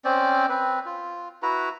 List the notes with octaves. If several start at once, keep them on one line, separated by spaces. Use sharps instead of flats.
C4 C#4 C5 D5
C4 B4
F4
E4 F#4 B4 A#5